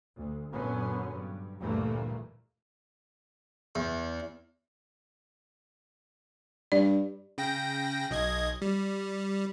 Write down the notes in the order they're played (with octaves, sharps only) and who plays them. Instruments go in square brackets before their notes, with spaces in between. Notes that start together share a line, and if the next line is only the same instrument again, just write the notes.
[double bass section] D2
F#2 A#2 D3 F#3 B3 C#4
G2
D2 G2 A#2 E3 A3 A#3
[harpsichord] E2
[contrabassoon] G2 [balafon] D5
[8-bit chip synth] C#3 G5 A#6
B1 D#5 G#6
G3